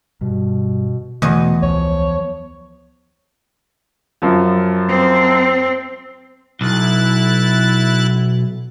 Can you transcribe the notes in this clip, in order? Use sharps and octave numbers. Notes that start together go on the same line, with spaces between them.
G2 B2
E2 B2 A3 D#5
C#2 F3 C#5
F#2 F3
C4
B1 E4 F#6 A6